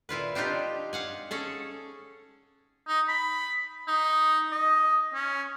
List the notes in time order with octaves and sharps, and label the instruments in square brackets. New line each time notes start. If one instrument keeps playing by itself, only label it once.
[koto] A#2 E4 F4 B4
C4 D4 D#4 F4 G4
F5 F#5 G#5
C#4 G#4 A4
[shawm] D#4
B5
D#4
D#5
C#4